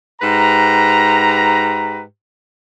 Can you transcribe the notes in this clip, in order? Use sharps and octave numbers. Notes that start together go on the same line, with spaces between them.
G#2 G4 B4 A#5